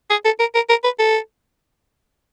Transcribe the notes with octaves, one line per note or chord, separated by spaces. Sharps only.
G#4
A4
A#4
A#4
A#4
B4
A4